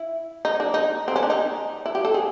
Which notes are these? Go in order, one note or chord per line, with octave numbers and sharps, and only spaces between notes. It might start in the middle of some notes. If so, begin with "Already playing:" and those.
Already playing: E4
D#4
D4
D#4
C4
C#4
D4
D#4
E4
G4
A4
G#4